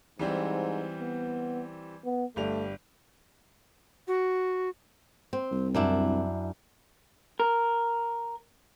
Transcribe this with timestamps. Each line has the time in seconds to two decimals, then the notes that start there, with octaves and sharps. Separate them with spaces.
0.19 G#2 E3 G3 C4
1.00 B3
2.05 B3
2.36 G1 G3 A3 F7
4.08 F#4
5.33 C4
5.52 C2
5.75 F#2 D4 E4
7.40 A#4